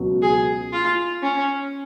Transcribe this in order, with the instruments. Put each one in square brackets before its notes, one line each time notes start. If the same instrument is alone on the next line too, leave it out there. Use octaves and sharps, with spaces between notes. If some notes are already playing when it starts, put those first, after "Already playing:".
Already playing: [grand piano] C#2 B2 F#3 B3 F#4
[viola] G#4
F4
C#4